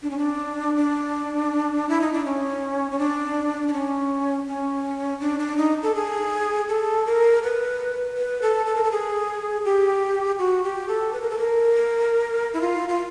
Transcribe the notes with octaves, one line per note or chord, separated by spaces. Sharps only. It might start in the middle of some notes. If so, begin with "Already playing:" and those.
D4
C#4
D4
D4
E4
D#4
D4
C#4
C#4
D4
D4
C#4
C#4
D4
D4
D#4
A4
G#4
A4
A#4
B4
B4
A4
A4
A#4
A4
G#4
G4
F#4
G4
A4
B4
A#4
A4
A#4
E4
F4
F4